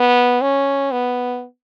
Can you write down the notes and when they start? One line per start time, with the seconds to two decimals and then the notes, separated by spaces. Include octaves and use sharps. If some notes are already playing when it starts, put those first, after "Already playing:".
Already playing: B3
0.42 C#4
0.92 B3